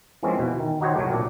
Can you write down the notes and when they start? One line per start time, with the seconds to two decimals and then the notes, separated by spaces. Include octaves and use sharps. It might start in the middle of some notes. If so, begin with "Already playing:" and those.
0.23 E3 F3 G#3 A#3 C4 C#4
0.39 B2 E3
0.60 D#3
0.80 D#3 D#4 F#4 G4 C5 C#5
0.95 C2 C3 F#3 G3 A3
1.10 A#2 D4